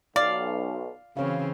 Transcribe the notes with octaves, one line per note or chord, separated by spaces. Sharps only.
B1 D5 F5
C#3 E3 C4 C#4 F#4 B4 C#5 F5